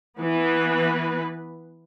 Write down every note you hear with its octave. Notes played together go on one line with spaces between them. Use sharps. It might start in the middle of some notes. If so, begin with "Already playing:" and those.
E3 B3 B4